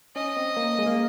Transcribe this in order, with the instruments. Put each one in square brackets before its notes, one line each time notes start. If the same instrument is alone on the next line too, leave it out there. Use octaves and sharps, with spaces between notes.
[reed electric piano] C#4 [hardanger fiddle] D#5
[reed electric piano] C4
A#3
G#3
A#3